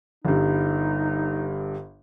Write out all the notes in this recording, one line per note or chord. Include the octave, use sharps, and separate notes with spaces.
G1 G2 D#4